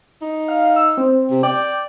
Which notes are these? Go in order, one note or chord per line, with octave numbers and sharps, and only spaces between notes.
D#4
F5
E6
C4
C3
D5 G5